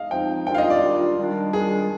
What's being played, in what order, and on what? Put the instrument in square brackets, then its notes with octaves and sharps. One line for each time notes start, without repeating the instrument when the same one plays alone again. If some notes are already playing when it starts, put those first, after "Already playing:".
Already playing: [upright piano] D#5 F5
[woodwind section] F3 C4 D#4 [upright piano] G5
[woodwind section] D#3 G3 D4 F4 [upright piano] G5
[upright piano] F5
D#5
D5
[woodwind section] D#3 G3 D4 F4
D#3 G3 D4 F4
[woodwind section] D#3 G3 D4 F4 [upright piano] G#4